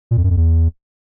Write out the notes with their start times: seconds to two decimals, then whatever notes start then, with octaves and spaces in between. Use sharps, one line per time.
0.11 A#2
0.17 F2
0.24 F#2
0.30 F2
0.37 E2